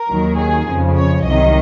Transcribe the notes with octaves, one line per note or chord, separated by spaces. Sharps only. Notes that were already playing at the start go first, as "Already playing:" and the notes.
Already playing: A#4
D#2 D#3 F#3
G#4
F2 C#3 F3
C#5
C2 C3 D#3 F#3 D#5